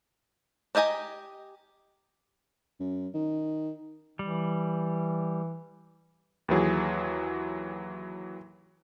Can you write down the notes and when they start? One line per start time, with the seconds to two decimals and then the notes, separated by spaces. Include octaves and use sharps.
0.75 D4 G4 D#5 G#5 A#5
2.80 F#2
3.14 D#3
4.19 E3 G3
6.48 D#2 E3 F#3 G#4